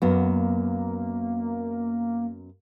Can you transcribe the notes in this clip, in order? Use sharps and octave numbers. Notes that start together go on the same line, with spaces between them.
F#2 A#3 B3 F#4